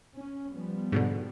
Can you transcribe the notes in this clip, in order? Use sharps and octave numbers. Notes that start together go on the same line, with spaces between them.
C#4
F3 G3 B3
G#2 B2 D3